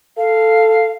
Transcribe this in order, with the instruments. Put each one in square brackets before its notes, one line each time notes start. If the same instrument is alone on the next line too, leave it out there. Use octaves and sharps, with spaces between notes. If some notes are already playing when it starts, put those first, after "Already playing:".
[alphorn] A4 [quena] F5